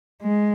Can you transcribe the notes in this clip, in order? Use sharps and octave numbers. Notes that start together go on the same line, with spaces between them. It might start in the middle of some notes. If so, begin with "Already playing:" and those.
G#3